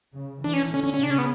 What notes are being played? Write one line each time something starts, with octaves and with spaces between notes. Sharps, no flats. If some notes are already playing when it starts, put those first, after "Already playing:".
C#3
E3 D4
C#4
D3 C#4
C#4
C#4
C#3 D4
C#4
B3